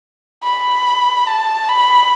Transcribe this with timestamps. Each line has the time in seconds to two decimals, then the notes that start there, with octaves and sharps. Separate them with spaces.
0.43 B5
1.27 A5
1.69 B5